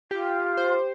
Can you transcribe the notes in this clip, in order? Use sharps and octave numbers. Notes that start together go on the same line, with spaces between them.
F4 G4
C5